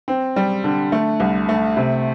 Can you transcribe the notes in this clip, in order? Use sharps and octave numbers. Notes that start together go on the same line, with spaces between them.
C4
G3
D3
A3
C2
A3
C3